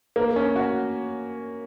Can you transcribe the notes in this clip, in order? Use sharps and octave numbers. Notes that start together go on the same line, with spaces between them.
A#3
C#4
F#4